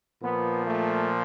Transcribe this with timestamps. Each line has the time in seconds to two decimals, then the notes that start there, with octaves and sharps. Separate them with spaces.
0.22 A#2 F3 B3
0.67 A3